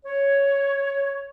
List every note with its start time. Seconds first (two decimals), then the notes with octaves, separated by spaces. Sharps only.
0.05 C#5